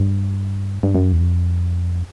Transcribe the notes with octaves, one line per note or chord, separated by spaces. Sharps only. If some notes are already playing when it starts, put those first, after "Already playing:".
Already playing: G2
G2
F#2
E2
F2